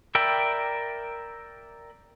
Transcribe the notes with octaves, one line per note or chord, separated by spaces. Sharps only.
A#4 D5 E5 G5 B5